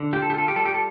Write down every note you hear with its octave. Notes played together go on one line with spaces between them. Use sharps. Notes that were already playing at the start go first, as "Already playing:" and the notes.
Already playing: D3
F4 G4
A4
G4
F4 A4
G4
G3 A4
G4
A4